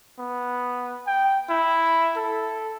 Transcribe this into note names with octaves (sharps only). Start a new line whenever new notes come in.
B3
G5
E4
A4